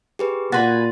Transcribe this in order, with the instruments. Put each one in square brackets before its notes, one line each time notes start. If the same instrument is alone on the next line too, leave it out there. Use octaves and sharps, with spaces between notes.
[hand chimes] G4 G#4 B4
[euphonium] A#2 [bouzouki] F#4 B4 G#5 [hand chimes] C6 A6